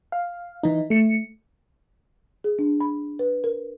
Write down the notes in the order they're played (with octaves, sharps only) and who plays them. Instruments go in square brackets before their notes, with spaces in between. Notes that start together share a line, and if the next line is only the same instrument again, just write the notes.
[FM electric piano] F5
E3 D#4
A3 C#7
[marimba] G#4
D4
B5
B4
A#4